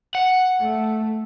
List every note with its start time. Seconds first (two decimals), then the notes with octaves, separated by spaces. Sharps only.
0.15 F#5
0.61 A3